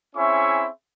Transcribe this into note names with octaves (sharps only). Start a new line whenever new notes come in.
C4 C#4 E4 G#4 E5 C#6